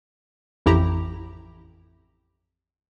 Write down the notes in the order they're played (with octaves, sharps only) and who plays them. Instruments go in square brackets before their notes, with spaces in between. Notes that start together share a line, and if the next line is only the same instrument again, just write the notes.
[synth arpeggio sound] A1 F2 E4 G4 A#5